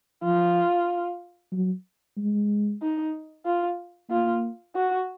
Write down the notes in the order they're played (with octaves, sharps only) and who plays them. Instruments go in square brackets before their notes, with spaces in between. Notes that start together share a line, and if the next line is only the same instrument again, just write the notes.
[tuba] F3 [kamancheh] F4
[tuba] F#3
G#3
[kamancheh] D#4
F4
[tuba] A#3 [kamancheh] F4
[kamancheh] F#4